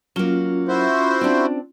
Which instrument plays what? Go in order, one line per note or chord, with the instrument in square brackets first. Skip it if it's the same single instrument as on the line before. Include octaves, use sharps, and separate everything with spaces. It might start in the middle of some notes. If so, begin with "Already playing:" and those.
[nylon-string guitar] F#3 A#3 [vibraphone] C#4 F4
[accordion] E4 F#4 C5
[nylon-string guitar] C4 D4